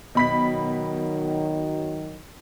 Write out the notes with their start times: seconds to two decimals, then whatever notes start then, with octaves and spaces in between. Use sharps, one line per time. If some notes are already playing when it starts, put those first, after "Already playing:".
0.15 B2 D#3 F#3 B5 B6